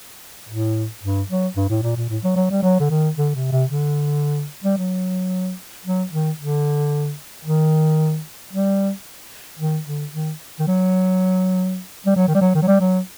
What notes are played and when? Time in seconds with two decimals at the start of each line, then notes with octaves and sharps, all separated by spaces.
0.49 A2
1.03 G2
1.29 F#3
1.56 G2
1.69 A2
1.82 A#2
1.97 A#2
2.09 A2
2.24 F#3
2.36 F#3
2.50 G3
2.63 F#3
2.80 D3
2.90 D#3
3.17 D3
3.35 C3
3.52 C3
3.70 D3
4.64 G3
4.77 F#3
5.85 F#3
6.12 D#3
6.38 D3
7.45 D#3
8.53 G3
9.59 D#3
9.86 D3
10.12 D#3
10.59 D#3
10.67 F#3
12.06 G3
12.16 F#3
12.28 D#3
12.34 G3
12.41 F#3
12.55 D#3
12.62 F#3
12.68 G3
12.80 F#3